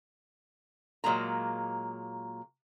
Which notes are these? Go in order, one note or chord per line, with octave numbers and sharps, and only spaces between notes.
A#2 F#3 G#3 A#3 A#5